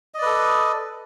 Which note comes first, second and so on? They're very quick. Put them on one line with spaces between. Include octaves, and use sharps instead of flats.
D#5 D5 B4 A4